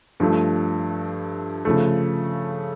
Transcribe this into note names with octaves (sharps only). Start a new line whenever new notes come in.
G2 F3 A3
C#3 F3 A3